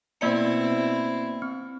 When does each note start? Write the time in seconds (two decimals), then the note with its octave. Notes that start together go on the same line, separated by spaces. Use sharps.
0.21 B2 A#3 C4 E4 D5 C#7
1.42 C4